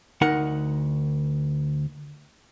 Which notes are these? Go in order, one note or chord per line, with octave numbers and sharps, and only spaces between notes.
D2 D#4 A#4 F#5